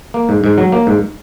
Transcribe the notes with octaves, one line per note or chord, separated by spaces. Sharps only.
A#3
G#2
G#2
F#3
A#3
G#2